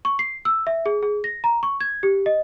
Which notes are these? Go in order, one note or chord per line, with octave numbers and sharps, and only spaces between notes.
C#6
C7
E6
E5
G#4
G#4
A#6
A#5
C#6
G#6
G4
D#5